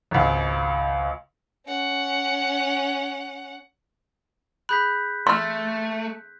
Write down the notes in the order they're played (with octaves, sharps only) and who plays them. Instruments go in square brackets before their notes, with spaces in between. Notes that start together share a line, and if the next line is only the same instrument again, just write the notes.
[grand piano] G#1 C#2
[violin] C#4 F#5
[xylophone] G#4 B5 [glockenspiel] F#6 G6 B6
[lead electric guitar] A3 [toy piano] C6 [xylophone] E6 F6